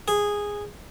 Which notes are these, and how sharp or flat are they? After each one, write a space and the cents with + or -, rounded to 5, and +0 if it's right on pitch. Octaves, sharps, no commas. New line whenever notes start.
G#4 -10